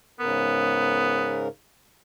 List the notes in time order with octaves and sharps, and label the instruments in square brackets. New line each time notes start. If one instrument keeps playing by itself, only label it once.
[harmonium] G#2 C#3 A#4 [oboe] B3